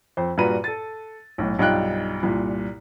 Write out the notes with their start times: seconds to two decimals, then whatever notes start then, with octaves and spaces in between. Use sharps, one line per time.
0.17 F2 C5
0.38 G2 A#2 F#4 B4 A#5 D#7
0.64 A4 A6
1.38 B1 A2
1.59 B1 G2 D#4 F4 G5 F#6
2.23 C2 G2 A#2